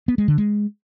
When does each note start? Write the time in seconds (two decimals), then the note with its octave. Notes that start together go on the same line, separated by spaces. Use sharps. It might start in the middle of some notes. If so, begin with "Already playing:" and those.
0.08 B3
0.18 G#3
0.28 D3
0.38 G#3